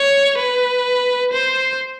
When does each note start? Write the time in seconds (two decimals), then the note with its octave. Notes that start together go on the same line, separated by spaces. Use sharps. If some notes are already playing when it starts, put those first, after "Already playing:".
Already playing: C#5
0.38 B4
1.33 C5